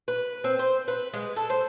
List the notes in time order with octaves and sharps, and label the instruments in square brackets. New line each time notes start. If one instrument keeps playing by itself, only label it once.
[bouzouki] B4
C4
C5
B4
G#3
A4
C5